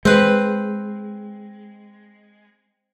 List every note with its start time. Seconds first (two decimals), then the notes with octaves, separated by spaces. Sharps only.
0.05 G#3 C4 B4